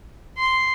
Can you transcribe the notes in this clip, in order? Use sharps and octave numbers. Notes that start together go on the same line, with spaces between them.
C6